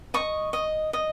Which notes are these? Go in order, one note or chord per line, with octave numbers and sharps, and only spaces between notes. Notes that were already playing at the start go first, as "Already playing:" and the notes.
D#5 C#6
D#5
D#5